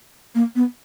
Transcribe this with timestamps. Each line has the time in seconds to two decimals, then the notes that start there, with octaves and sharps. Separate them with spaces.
0.35 A#3
0.56 B3